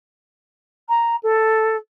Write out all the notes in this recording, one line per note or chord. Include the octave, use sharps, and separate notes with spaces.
A#5
A4